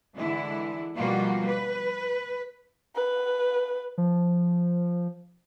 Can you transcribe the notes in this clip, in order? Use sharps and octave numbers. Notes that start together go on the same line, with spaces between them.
D3 E3 G#3 E4
B2 F3 G3 A#3 F4 F#4
B4
B4
F3